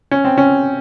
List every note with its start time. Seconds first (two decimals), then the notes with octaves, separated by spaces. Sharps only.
0.11 C#4
0.25 C4
0.38 C#4